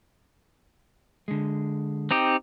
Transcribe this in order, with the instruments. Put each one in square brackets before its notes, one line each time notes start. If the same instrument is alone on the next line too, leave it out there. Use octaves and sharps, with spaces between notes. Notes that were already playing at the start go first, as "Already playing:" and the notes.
[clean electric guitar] D3 G#3
[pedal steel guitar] C4 D#4 G4